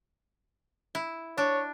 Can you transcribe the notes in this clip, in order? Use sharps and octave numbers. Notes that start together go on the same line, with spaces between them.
E4
D4 C#5